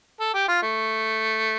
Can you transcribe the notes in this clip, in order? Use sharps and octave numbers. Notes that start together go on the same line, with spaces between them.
A4
G4
F4
A3